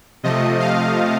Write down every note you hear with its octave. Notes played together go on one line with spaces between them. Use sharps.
C3 F3 A3 D#5
F5